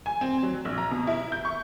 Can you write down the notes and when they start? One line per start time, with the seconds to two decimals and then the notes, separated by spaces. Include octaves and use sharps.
0.06 G#5
0.21 C4
0.43 F#3
0.65 A#1
0.78 A#5
0.91 B2
1.07 E4
1.32 G6
1.45 C#6